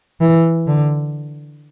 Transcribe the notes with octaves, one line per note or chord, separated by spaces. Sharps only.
E3
D3